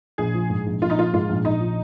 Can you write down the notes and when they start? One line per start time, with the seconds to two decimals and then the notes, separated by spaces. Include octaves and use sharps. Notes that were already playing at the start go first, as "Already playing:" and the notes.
0.18 A#1 G#4
0.34 F3
0.50 G#2
0.67 A#1
0.82 A#1 F4
0.90 D#4
0.98 F3 F4
1.13 G#2 F4
1.29 A#1
1.45 A#1 D#4
1.61 F3